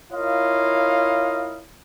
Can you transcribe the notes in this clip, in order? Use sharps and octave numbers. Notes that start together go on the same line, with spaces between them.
E4 F4 A#4 C#5 D#5 F5